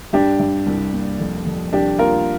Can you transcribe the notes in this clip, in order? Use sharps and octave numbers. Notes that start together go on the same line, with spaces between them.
G2 D4 G4
G2
C2
A#3
F2
F2
C2 D4 G4
A#3 F4 A#4